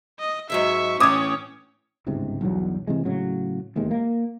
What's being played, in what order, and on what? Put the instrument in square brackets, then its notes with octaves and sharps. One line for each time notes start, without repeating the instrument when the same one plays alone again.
[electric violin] D#5
[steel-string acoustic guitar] G#2 F#3 G#3 [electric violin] E5 C#6
[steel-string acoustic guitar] A2 E3 [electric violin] C#4 C#5 [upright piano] D6 D#6 G#6
[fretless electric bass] G1 C#2 G#2 C3
B1 E2 G2 F#3
C3 E3 G#3
A2 C#3 F#3
E1 D#2 C3 G#3
A#3